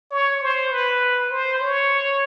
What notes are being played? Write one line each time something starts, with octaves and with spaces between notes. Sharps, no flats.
C#5
C5
B4
C5
C#5